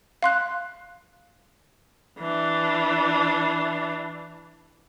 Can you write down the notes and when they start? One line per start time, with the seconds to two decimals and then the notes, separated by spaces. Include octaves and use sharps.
0.23 F5 C6 F#6
2.19 E3 D4